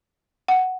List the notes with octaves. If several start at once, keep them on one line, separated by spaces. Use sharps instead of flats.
F#5